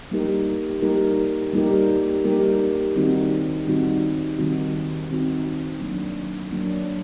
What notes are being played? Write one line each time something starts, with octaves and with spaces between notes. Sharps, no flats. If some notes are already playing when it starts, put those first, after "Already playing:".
G3 A#3 D#4 G4 A#4
G3 A#3 D#4 G4 A#4
G3 A#3 D#4 G4 A#4
G3 A#3 D#4 G4 A#4
D#3 G3 C4 D#4 F#4
D#3 G3 C4 D#4 F#4
D#3 G3 C4 D#4 F#4
D#3 G3 C4 D#4 F#4
F#3 A#3 D4
F#3 A#3 D4